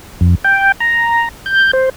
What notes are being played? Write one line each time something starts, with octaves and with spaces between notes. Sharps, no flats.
F2
G5
A#5
G6
C5